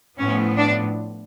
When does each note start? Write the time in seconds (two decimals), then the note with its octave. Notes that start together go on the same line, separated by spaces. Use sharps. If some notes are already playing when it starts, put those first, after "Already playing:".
0.19 A2 F3 B3 C#4
0.58 D4